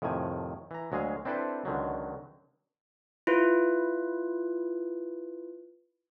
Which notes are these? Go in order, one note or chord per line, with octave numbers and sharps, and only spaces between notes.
F2 A2 C3 D#3 G#5
E3 A#5
D2 F#3 G#3 G#4 F5
C4 D4 E4 A4 B4 C5
C#2 D3 D#3 F#3
E4 F4 B4